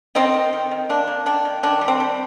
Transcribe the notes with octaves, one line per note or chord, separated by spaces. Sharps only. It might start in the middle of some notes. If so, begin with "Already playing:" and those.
D#3 C4 D#4
D#3
D#3
D#3
A#3 D4
A#3
D#3 D4
D#3
D#3 D4
G3
C4
G3